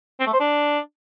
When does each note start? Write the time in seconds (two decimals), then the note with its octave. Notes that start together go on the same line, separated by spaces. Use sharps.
0.20 C4
0.27 A3
0.33 C5
0.40 D4